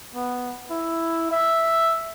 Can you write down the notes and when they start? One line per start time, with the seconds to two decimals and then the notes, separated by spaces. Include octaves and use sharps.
0.14 B3
0.70 E4
1.31 E5